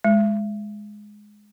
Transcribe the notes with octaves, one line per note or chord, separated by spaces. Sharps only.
G#3